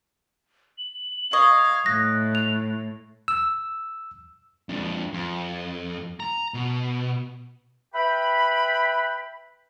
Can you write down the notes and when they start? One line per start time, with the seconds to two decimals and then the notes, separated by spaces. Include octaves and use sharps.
0.78 F#7
1.33 D#5 F5 C#6 G#6
1.86 A2 F#6 A#6
2.35 F7
3.28 E6
4.69 F2 D4
5.13 F2
6.20 A#5
6.54 B2
7.94 B4 E5 G5 B5